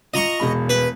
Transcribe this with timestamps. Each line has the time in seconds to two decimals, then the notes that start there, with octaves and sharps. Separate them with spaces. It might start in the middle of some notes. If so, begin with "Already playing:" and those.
0.14 F4 D#5 A#5 C#6
0.40 E1 G#3 B5
0.70 B4